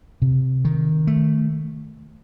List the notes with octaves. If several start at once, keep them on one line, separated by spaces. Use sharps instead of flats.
C3
D#3
A3